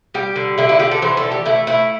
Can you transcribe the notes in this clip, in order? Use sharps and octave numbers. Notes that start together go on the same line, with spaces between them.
G3 G4
D3
D3 E4
E4
D3 G4
A4
E3 C5
A4
A3
G4
A3 E4
A3 E4